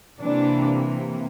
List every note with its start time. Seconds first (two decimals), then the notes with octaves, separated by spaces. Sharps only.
0.19 C3 E3 A#3 D4